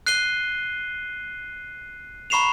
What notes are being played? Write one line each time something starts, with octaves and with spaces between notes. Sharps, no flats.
F#6 C7 D#7 G7
A#5 B5 C#6 C7 E7 F7